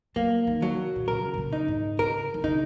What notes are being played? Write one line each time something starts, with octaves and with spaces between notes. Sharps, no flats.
F#3 A#3
D#3
F#3
A#2
C#3 A#4
A#2
C#3
D#4
G#2
C#3 A#4
D#3
C#3 D#4